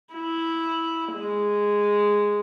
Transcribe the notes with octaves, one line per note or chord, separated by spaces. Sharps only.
E4
G#3